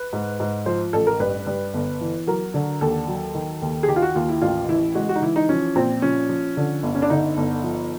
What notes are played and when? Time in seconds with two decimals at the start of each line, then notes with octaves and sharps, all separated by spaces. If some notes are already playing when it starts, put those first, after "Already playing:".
Already playing: B4
0.13 G#2
0.40 G#2
0.66 F3 C5
0.93 A1 A4
1.07 A#4
1.20 G2 B4
1.47 G2
1.74 G1
2.01 E3
2.27 F#3 A#4
2.54 D3
2.81 D#2 A4
3.08 F#3
3.35 D#3
3.62 D#2
3.83 G#4
3.88 D#3 G4
3.96 F4
4.02 F#4
4.15 D#2 F4
4.29 E4
4.42 A1 F4
4.68 E3 E4
4.95 G#3 F#4
5.09 F#4
5.16 D#4
5.22 E3 E4
5.36 D#4
5.49 F3 C#4
5.76 A#2 C4
6.02 F3 C#4
6.29 F3
6.57 D3
6.83 G1
6.95 C#4
7.02 D4
7.10 D3 D#4
7.37 G1
7.64 F3